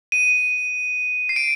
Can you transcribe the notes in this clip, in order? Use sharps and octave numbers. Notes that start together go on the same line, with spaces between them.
D#7
C7
D7